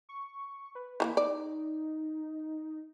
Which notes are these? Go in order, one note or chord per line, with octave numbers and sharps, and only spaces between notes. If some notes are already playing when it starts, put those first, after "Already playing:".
C#6
B4
E3 F#3 A#3 B5
D#4 D5